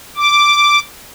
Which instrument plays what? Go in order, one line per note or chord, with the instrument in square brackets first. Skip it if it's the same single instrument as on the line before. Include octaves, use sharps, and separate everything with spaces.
[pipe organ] D6